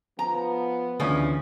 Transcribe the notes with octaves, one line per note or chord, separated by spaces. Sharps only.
F3 B3 A#5
D2 C#3 E3 F3 C#4 D4 C#5